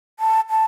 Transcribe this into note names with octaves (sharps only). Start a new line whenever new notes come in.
A5
A5